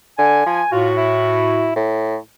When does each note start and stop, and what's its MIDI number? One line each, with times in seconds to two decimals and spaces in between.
0.19 0.46 50
0.19 0.67 80
0.46 0.62 53
0.72 1.75 45
0.72 0.88 65
0.72 1.75 66
0.97 1.75 64
1.76 2.17 45